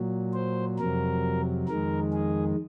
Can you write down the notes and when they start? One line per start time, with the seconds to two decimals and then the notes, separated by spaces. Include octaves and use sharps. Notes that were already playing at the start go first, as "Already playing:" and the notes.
Already playing: A#2 F#3
0.34 C5
0.78 F2 C3 F#3 A#4
1.68 F2 D#3 G#3 A#4
2.13 G#4